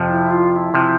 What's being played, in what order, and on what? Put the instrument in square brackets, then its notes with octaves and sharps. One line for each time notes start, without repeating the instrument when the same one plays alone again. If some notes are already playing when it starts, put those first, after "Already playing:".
Already playing: [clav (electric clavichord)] F2 C3 F3
[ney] E4
F4
F4
E4
[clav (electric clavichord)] C3 F3